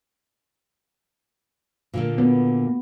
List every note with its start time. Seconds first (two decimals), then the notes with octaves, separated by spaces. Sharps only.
1.93 A#2 D3 A#3
2.18 B3